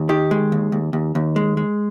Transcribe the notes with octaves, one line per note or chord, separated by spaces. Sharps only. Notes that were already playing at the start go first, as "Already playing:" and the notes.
Already playing: D#2
D#3 G4
G#3
D#2
D#2
D#2
D#2
G#3
G#3